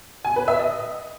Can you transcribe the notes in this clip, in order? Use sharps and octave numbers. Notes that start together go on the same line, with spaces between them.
G#5
B4
E5
D#5